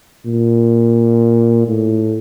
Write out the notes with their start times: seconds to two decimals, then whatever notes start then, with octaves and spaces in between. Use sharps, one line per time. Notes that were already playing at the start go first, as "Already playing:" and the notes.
0.26 A#2
1.68 A2